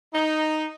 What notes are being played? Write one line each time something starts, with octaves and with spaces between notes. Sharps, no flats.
D#4